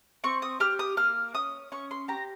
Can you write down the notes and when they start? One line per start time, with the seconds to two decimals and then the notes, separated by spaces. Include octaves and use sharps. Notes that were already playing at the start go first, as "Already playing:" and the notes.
0.24 C4 C#6
0.42 D#6
0.60 G4 F6
0.79 D#6
0.97 A#3 F6
1.35 C#4 D#6
1.72 C#4 C#6
1.91 C6
2.08 G4 A#5